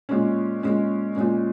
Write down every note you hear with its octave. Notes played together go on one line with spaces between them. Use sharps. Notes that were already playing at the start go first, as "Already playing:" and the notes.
A#2 G#3 C#4
A#2 G#3 C#4
A#2 G#3 C#4